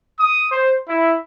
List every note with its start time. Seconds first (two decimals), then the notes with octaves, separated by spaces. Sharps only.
0.19 D#6
0.51 C5
0.88 E4